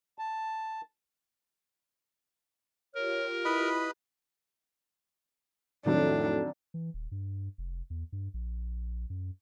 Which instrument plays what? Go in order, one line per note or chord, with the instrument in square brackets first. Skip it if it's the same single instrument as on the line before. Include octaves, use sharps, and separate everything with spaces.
[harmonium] A5
[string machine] F4 G4 [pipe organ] A#4 [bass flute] C#5
[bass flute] E4 [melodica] B4 D#5 B5
[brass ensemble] F2 A2 [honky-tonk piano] D#3 F#3 C4 [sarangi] D4 [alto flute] A4
[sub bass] E3
D#1
G2
F1
E2
G2
A#1
F#2